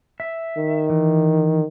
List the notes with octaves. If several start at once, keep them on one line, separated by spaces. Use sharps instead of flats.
E5
D#3
E3